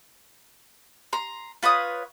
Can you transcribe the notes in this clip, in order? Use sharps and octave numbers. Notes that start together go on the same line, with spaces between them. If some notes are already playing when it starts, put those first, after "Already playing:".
A#5 C6
F4 B4 C#5 D#6